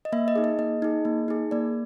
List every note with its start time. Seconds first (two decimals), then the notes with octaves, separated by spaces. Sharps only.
0.05 D#5
0.12 A#3 E5
0.28 D#5
0.36 D#4 G#4
0.44 D#5
0.58 A#3 D#5
0.82 D#4 G#4
1.05 A#3
1.28 D#4 G#4
1.51 A#3 D5